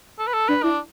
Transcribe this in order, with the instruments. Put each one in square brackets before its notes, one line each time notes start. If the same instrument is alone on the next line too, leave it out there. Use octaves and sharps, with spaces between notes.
[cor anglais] A4
B4
A4
[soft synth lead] D4 [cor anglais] B4
[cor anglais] D4 [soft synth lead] E4